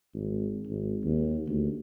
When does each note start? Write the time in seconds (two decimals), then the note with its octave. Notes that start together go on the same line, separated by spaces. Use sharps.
0.14 G#1
0.67 G#1
1.05 D#2
1.47 D2